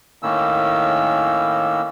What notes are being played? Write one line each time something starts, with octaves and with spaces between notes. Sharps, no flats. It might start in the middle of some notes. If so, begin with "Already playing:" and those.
A2 D#3 A#3 C#4 E6